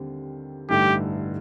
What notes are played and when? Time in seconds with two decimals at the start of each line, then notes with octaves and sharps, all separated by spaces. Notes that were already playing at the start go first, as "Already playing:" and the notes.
Already playing: D#2 D3 G3 C4
0.69 A1 G2 D3 A3 D#4 G4